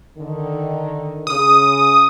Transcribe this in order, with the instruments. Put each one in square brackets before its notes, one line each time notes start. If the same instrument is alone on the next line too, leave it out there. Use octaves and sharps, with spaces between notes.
[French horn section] D3 D#3
[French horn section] C#3 [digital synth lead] D#6